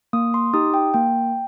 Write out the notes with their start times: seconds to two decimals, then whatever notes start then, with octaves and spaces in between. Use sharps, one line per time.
0.13 A#3 D#6
0.34 C6
0.54 D#4 G4 D#6
0.74 G5
0.94 A#3 G5